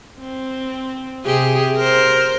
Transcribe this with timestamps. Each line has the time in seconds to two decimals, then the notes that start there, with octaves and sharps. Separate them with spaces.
0.20 C4
1.25 C3 G4 G#4
1.77 A#4 C5